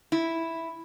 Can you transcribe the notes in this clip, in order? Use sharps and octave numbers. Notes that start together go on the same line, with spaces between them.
E4